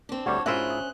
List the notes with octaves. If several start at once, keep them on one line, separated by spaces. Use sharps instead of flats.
C4 D4
D2 G3 G4 C#5 F#5 D6
G#2 C#4 E4 F4 A#4 C5 E5 F#6
D#6